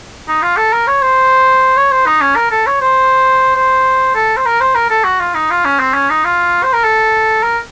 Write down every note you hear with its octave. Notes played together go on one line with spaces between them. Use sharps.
D#4
F4
A4
A#4
C#5
C5
C#5
C5
D#4
C#4
A#4
A4
C#5
C5
C5
A4
C5
A#4
C5
A#4
A4
F#4
F4
D#4
F4
C#4
C4
C#4
D#4
F4
C5
A#4
A4
A#4